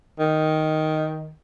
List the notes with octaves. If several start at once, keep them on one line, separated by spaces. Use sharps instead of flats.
D#3